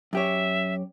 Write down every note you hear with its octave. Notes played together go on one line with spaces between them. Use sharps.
F#2 G4 C#5 E5